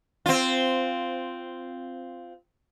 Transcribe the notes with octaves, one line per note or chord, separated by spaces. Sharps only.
C4 F4